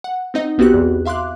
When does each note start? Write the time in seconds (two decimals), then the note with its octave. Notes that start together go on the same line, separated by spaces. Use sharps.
0.04 F#5
0.34 C4 D#4 D#5
0.58 B1 B3 C4 F#4 G4 F#6
0.74 E2
1.05 E5 F5 C6 D6 F#6